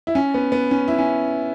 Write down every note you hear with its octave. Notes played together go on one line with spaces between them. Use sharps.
E4
C#4
B3
B3
C#4
E4
C#4